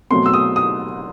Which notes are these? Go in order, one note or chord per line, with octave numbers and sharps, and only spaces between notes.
B2 F#3 A3 C4 C6
E6
D#6
D#6